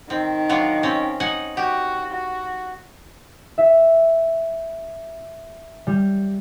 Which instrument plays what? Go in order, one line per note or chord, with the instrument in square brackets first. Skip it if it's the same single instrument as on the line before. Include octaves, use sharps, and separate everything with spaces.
[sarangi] D#3 [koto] C4
[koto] F#3 D4 F4
C4 C#4
D#4 F#5 G#5
[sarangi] F#4 [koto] G4
[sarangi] F#4
[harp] E5
G3